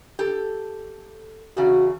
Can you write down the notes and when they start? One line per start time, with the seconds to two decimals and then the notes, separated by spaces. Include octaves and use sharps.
0.19 G4 A4
1.57 E2 C#3 F#4